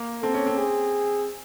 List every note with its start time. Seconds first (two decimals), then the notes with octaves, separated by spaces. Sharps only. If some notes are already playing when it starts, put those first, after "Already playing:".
Already playing: A#3
0.22 C4 A4
0.34 C#4
0.46 C4
0.58 G#4